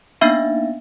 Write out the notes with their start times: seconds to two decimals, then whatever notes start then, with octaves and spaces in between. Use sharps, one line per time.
0.21 A#3 B3 D4 D#4 E5 F5